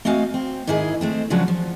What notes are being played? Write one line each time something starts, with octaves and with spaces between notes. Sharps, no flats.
A3 C4 F#4 D#5 F5 G#5
C4
G#2 D#3 E4 G#4 D#5
G#3 A3 C4
C#3 F3 F#3 G#3 D4 F#4
F3